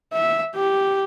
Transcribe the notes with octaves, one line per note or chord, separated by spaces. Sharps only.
E5
G4